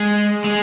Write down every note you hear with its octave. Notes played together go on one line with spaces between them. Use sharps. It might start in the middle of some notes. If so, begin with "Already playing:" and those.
Already playing: G#3
G#3